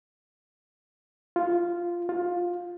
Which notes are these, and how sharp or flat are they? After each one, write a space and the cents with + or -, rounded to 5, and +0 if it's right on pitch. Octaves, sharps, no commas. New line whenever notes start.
F4 -5
F4 +15